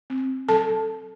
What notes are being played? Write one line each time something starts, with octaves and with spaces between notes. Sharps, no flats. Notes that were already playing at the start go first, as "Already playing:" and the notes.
C4
F#3 A4 A5